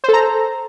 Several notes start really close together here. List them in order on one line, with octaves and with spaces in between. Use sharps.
C5 A4 A#5